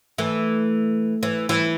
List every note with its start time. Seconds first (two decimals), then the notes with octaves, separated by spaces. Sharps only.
0.18 E3 A3
1.23 E3
1.49 E3